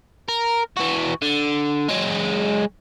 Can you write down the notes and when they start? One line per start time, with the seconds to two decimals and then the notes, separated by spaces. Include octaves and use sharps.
0.29 A#4
0.77 E3 F#4
1.22 D3
1.89 F#3 G#3